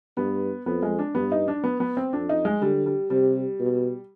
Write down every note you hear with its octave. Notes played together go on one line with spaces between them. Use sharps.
G2 B3
F2 B3
G#3
D4
G2 B3
D#4
D4
B3
B3
C4
F2 D4
D#4
G#3
D3 G3
G3
C3 G3
B2